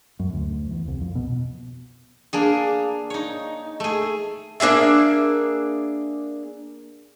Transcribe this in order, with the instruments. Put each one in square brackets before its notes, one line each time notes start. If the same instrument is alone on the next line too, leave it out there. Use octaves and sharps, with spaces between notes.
[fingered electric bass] F#2
D2
E2
C2
F2
B2
[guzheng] A#3 D4 G#4
D#4 C#5
A3 G#4
[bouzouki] A#3 D4 G#4 E5